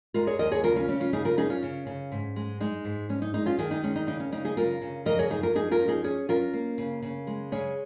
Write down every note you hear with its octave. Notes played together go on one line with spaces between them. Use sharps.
G#3 F4 A#4
G#4 C#5
D#2 A#4 D#5
G#4 C#5
C#3 F4 A#4
C#4 F4
C#3 C#4
C#4 F4
C#3 D#4 G#4
F4 A#4
C#4 D#4 G#4
C#4 F4
C#3
C#3
G#2
G#3
G#3 D#4
G#2
G#3 C#4
D#4
G#3 D#4
C#4 F4
D#3 D#4 G#4
D#4
G#3 C#4
D#4
C#3 D#4
C#4
C#3 D#4
D#4 G#4
C#3 F4 A#4
C#3
F2 A#4 D#5
G#4 C#5
F2 D#4 G#4
F4 A#4
F3 D#4 G#4
F4 A#4
C#4
D#4 G#4
C#4 G#4 C#5
C#4 F4 A#4
A#3
C#3
C#3
G#3
C#3 G#4 C#5